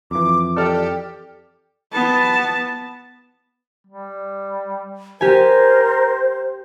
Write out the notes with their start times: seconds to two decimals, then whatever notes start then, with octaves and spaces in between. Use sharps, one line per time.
0.11 F2 E3 D6
0.56 G4 A4 D5 F6
1.93 B3 A5
3.87 G3
5.21 G4 A#4 C5 G#5